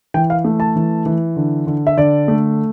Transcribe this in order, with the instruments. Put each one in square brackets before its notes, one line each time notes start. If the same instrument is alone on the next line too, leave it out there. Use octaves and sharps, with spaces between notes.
[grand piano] E3 G5
F5
A3
A5
E3
E3
D3
D3
E5
D3 D5
A3